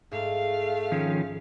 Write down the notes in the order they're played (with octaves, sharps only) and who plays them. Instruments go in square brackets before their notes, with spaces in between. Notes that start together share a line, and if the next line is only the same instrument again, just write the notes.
[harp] G#2 [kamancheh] A3 F5
[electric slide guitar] D#3 F3 C#4